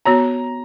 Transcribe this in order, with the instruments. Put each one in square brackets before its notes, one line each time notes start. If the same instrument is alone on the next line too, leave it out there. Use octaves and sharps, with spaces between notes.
[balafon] B3 F#4 C#5 [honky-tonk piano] A#5